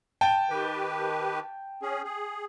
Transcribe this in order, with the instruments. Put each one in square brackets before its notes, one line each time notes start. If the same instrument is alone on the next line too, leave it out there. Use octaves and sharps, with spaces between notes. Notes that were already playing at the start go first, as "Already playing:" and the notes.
[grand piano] G5 A5
[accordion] D#3 G4 B4
C#4 G#4
G#4